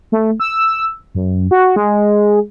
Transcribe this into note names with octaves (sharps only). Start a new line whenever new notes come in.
A3
E6
F#2
F#4
G#3